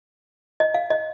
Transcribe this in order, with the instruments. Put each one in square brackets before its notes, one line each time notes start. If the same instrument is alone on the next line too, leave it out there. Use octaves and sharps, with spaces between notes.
[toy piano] D#5
F5
D#5